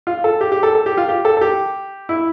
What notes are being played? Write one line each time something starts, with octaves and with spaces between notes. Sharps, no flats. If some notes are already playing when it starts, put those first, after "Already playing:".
F4
A4
G4
G4
A4
A4
G4
F4
G4
A4
A4
G4
E4